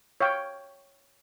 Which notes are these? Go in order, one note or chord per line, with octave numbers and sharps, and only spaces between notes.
C#5 F5 G5